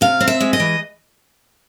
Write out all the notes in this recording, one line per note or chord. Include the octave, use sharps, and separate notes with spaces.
C3 F5
C4
E5
G#3
D#5
E3